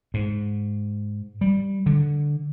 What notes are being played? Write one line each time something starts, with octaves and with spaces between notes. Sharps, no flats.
G#2
G3
D3